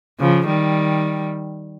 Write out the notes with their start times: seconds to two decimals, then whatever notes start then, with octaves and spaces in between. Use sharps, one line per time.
0.19 C#3 F3
0.47 D#3 G3